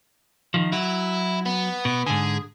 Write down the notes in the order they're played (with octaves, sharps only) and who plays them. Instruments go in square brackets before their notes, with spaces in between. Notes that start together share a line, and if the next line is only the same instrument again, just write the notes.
[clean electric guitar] D#3 F3
[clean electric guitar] F#3 [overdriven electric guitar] E4
[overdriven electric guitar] B3
[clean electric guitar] B2
[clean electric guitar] G#2 D3 [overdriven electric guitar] G#4